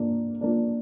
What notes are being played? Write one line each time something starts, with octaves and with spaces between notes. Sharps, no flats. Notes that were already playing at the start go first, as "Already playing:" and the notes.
Already playing: F3 A#3 D4
F3 A#3 D4